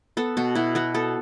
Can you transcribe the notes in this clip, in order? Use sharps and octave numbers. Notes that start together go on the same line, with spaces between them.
B3 A4
B2 F#4
B2 E4
B3 F#4
B3 A4